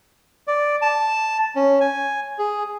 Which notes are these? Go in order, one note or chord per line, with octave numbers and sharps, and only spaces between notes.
D5
A5
C#4
G#5
G#4